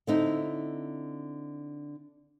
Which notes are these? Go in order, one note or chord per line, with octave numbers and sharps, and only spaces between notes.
D3 C4 D#4 E4